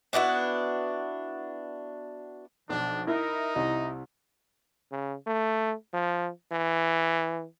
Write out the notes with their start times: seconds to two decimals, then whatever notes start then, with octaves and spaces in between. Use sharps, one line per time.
0.13 B3 D4 E4 F#4
2.69 B1 F3 D4
3.07 D#4 E4 A#4
3.55 C2 D#5
4.92 C#3
5.27 A3
5.94 F3
6.52 E3